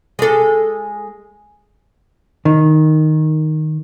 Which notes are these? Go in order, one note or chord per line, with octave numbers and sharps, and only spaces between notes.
G#3 A4
D#3